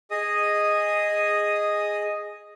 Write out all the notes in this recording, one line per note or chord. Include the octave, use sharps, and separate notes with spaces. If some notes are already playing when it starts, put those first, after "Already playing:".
G#4 D#5 D#6